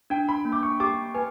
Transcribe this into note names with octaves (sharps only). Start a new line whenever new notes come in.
D4 G5
B5
A#3
D6
C#6
G4 D6
B4 G#5